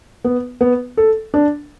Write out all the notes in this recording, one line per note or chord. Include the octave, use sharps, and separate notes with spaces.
B3
B3
A4
D4